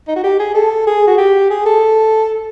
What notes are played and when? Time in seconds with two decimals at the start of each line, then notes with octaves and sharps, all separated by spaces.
0.08 D#4
0.16 F#4
0.23 G4
0.40 G#4
0.55 A4
0.87 G#4
1.07 F#4
1.18 G4
1.50 G#4
1.66 A4